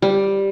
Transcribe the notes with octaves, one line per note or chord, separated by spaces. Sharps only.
G3